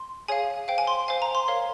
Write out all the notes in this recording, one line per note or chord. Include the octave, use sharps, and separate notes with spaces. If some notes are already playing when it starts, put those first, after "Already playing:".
Already playing: C6
G#4 C#5 F5 G#5
C5 F5 G5
G#5
C6
C5 F5 G#5
A#5
C6
A#4 C#5 F5